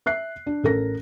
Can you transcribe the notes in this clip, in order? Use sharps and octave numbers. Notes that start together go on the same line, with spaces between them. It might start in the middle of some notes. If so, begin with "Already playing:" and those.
E5 F#6 C7
D4
A1 A4 A#4 A#6